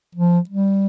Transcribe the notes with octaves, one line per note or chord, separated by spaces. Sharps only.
F3
G3